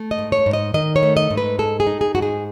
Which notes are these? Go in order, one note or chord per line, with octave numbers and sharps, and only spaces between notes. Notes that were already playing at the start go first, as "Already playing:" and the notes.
Already playing: A3
D#5
G#2
C#5
G#2
D#5
D#3 D#5
C#5
A3
D#5
G#2
B4
G#3 A4
G#4
D#4
G#4
G#2 F#4
G#4